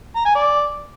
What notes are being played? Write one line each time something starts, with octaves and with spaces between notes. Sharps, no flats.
A#5
G#5
D5